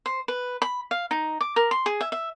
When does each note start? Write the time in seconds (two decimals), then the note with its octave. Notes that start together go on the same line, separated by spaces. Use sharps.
0.06 C5
0.28 B4
0.62 B5
0.91 F5
1.11 D#4
1.41 D6
1.56 A#4
1.71 C6
1.86 G#4
2.01 E5
2.12 E5